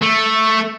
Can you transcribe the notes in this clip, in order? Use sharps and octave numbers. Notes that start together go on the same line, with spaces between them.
A3